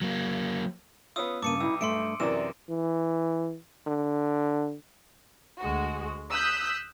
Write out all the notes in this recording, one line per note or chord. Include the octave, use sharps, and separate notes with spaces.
F#3 A#3
B3 C#4 F4 D#6 E6
G2 C#3 A#3 A5 D6 C#7 D#7
B1 E4 E6
G2 A3 E5 C6 C#7 D7
F#2 C3 E3 E4 A#4 D5 E7
E3
D3
D2 G#3 F#4
D#6 E6 F#6 G6 B6